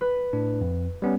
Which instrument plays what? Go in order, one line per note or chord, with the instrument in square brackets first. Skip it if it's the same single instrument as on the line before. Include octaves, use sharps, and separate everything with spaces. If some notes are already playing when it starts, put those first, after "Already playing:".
[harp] B4
[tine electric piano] A2 D4
F2
G3 B3 C#4